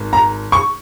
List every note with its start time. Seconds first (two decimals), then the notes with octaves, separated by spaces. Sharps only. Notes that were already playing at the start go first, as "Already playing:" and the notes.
Already playing: G#1
0.13 A#5
0.52 C#6